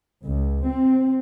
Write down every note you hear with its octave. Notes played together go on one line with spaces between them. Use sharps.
C#2
C4